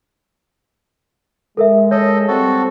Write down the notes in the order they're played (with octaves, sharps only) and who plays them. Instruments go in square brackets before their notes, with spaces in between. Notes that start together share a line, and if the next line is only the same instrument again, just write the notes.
[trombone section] G#3 [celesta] A4 A#4 E5
[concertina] A4 D#5 [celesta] C#5
[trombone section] G3 C4 [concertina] F#4 A4